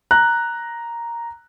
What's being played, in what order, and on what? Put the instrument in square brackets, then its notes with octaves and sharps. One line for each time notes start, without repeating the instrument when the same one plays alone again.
[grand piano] A#5 F#6